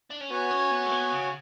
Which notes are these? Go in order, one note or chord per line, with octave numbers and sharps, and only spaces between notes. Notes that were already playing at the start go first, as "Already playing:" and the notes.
D4
C#4
B3 F#4 C#5 G#5
C#4
B3
A3
B3
C#3